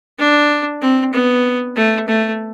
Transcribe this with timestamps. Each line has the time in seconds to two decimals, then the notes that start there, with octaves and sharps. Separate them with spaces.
0.19 D4
0.81 C4
1.13 B3
1.76 A3
2.08 A3